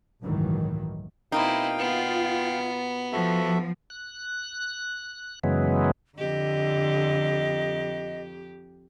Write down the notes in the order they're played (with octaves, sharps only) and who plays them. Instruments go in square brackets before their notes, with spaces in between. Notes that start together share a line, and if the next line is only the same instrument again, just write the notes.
[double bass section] G1 C#2 A2 D#3 E3 F#3
[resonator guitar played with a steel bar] B2 A#3 D#4 [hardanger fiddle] C4 E4 [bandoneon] F5 G5
[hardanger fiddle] B3 [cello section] F4
[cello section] F3 [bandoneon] F#4 A4 E5
[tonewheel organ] F#6
F#2 C#3 E3 F#3 G#3 B3
[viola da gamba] F2 G4 [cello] D3 [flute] D#5